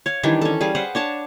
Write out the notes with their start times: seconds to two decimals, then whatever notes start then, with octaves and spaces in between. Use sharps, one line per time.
0.06 C#5 F5
0.23 D#3 E3 G3 D4
0.41 C#4 A4
0.61 G3 G#4 F5
0.75 B4 C5 F5 F#5
0.95 D4 C#5 A5